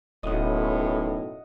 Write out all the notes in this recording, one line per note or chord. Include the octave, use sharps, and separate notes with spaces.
D1 B1 F#2 A2 D#5 F#5